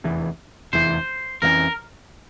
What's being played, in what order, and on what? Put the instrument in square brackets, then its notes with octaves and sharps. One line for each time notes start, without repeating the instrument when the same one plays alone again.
[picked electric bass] F1 E2 E3
[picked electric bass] F1 E2 E3 [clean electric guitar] C5
[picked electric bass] F2 E3 A#3 C#4 [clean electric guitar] A#4